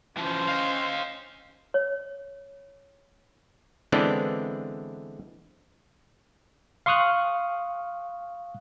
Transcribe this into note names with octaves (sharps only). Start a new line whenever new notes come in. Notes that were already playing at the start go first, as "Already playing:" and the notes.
E3 F3 C#4 C5
D#5 F5
C#5
D3 E3 G#3 B3 C4 D4
F5 C6 C#6 D#6 F6 F#6